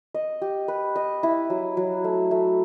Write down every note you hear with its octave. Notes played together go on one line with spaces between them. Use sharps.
D#5
G4
B4
D#5
E4
F#3
F#3
A3
A3